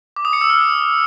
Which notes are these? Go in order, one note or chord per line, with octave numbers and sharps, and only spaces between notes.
D6
D#6
C#7
E6
F6